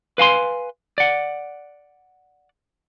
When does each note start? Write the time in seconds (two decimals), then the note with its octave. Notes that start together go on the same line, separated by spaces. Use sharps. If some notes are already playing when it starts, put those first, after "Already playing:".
0.18 B4 F5 G#5 C6
0.98 D5 F#5